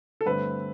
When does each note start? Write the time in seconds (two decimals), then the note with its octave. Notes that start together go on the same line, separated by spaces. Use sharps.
0.21 A4
0.26 G2 D3 A3 C4 B4